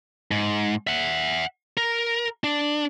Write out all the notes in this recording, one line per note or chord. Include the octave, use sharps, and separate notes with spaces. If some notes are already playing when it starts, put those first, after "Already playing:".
G#2
E5 F#5
A#4
D4